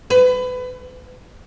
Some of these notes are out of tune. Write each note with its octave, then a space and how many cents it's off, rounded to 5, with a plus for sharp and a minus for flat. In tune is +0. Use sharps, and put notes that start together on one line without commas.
B4 +25